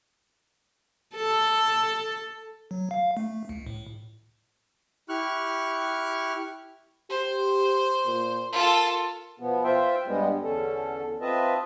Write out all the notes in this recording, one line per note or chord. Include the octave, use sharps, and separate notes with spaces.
A4
F#3
F5
A3
C#2
A2
E4 G4 C#6 F6 F#6
G4 C5
A#2
F4 A4 A#4
B2 F3 B3
F4 C5 E5 G5
G2 G3 G#3 B3
E2 D3 C#4 A4
C4 F4 B4 D#5 E5 A5